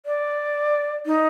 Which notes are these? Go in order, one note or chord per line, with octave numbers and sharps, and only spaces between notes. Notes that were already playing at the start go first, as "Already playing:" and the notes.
D5
D#4